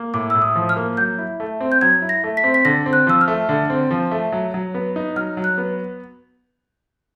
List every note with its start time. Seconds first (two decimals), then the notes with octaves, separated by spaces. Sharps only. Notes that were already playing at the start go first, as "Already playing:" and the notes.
Already playing: A#3
0.14 A2 D6
0.30 A2 E6
0.42 D#6
0.56 F3
0.69 F6
0.76 A#3
0.97 F#3 G6
1.18 E4
1.40 A3
1.61 C4
1.72 G6
1.81 F#3 G#6
2.02 E4
2.09 A#6
2.24 A3
2.37 B6
2.44 C4
2.54 B6
2.65 D3 A#6
2.86 C4
2.93 F#6
3.07 F3 E6
3.21 F6
3.28 A3
3.49 D3
3.70 C4
3.91 F3
4.11 A3
4.32 F#3
4.54 F#3
4.74 B3
4.96 D#4
5.16 F#3 F6
5.37 F#3
5.44 F#6
5.58 B3